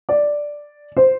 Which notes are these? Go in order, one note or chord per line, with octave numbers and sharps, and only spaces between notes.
D5
C5